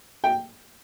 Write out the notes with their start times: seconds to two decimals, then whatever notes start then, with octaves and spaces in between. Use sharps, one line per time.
0.24 G5